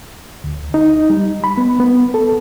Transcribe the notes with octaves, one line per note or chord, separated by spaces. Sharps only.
D2
D#4
G3
B5
B3
B3
A4